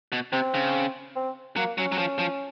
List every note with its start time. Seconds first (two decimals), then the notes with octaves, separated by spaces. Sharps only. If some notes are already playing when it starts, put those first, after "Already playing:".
0.12 B2
0.32 C3 C4
0.54 C#3
1.16 C4
1.57 F#3 A#3
1.78 F#3 C#4
1.92 F#3
1.98 F3
2.19 F3